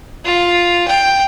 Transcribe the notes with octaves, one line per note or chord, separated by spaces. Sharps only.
F4
G5